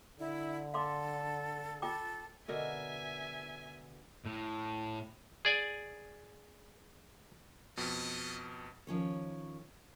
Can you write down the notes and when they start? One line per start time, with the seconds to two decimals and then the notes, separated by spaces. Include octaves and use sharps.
0.19 D3 E4
0.74 A4 F5 C6 D6
1.82 F4 A4 G5 D6
2.48 B2 D3 A#4 E5 G#5
4.25 A2
5.45 G#4 D5 G#5
7.77 F2 B2 C#4 A4 D#5
8.87 D#3 F3 C#4 C#5